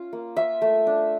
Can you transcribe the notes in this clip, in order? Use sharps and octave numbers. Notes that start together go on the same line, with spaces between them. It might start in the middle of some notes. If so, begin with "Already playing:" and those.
Already playing: C#4 F4
A#3
F4 E5
A3
D4